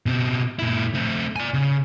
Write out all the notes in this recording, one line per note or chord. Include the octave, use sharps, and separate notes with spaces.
B2 C4
A#2 E4
A3 C4
D5 G#5
C#3